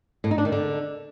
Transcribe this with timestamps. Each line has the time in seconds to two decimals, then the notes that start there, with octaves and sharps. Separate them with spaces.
0.24 A2
0.31 D#4
0.38 D4
0.45 D#3
0.52 D3